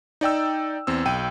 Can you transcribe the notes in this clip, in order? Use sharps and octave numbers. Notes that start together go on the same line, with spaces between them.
D#4 D5 G5 E6
E2 C4 E6
B1 G5 D#7